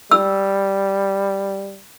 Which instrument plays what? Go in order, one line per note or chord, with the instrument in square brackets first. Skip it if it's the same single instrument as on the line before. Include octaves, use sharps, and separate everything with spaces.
[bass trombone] G3 [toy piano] E6